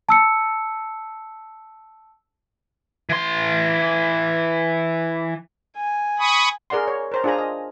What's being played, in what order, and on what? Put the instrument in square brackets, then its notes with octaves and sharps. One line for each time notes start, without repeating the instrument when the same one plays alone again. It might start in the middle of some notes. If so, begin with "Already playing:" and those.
[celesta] A5 E6 C#7
[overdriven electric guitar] E3 C6
[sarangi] G#5
[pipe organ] B5 C#6 D#6
[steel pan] G#4 A#4 D5 F#5 C6
C#5
A#4 C5 A#5
D4 F4 G#4 C5 G#5 A#5
D#5